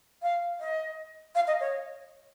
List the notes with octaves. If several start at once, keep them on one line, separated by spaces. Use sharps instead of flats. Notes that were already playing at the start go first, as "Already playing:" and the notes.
F5
D#5
F5
D#5
C#5